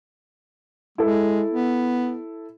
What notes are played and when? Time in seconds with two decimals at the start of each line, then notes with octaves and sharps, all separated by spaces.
0.98 G#3 E4 A4
1.50 B3